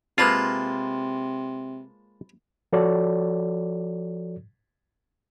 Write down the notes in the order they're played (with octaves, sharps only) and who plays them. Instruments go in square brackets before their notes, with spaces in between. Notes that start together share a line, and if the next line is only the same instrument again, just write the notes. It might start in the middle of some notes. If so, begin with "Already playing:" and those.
[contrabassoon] C3 [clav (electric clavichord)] G#3 A#3 F4 [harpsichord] B4 C5 A5
[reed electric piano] F3 F#4 A4 C#5 D5